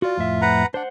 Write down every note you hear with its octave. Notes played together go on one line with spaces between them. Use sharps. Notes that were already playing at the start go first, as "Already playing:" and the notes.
F4 F#4 D5
F2 A2 E5
B4 F#5 A#5
D4 C5 F#5